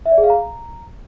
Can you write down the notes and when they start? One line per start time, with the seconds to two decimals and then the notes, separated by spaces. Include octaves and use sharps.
0.06 E5
0.12 D5
0.18 G#4
0.24 F5
0.30 A#5